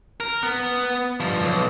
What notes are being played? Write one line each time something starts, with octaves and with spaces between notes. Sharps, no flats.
A#4
B3
G2 F3
B1